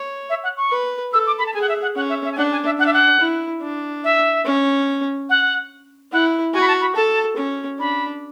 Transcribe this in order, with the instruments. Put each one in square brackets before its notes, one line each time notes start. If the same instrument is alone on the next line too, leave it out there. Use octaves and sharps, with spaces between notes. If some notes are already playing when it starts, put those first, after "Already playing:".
Already playing: [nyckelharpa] C#5
[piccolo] E5
F#5
C#6
[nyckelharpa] B4
[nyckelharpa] A4 [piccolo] E6
[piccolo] D6
B5
A5
[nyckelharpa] G#4 [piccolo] G#5
[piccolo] F#5
E5
F#5
[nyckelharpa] C#4 [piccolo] F#5
[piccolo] E5
E5
G#5
[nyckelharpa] D4 [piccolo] F#5
[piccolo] G#5
E5
[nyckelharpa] D4 [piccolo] F#5
[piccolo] E5
F#5
[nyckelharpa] E4
D4
[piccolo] E5
[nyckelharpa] C#4
[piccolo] F#5
[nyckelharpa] E4 [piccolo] F#5
[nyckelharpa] F#4 [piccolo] G#5
[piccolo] B5
A5
B5
[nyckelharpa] A4 [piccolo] A5
[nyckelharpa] C#4
[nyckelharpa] D4 [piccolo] B5